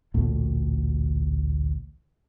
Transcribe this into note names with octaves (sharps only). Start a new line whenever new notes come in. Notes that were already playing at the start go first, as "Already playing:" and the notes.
A1 D2 A#2 A3